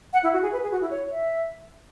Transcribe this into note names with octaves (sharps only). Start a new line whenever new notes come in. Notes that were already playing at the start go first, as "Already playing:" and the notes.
F#5
E4
F#4
G#4
B4
G#4
F#4
E4
C#5
E5